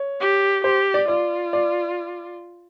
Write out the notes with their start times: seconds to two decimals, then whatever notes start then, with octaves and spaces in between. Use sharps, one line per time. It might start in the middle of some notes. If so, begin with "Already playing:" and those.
Already playing: C#5
0.20 G4
0.64 G4 C5
0.94 D5
1.08 F4 D5
1.53 D5